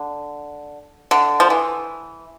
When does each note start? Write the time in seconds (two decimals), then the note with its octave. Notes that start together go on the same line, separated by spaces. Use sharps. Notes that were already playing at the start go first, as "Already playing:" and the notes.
Already playing: D3
1.11 D3
1.40 F3
1.50 E3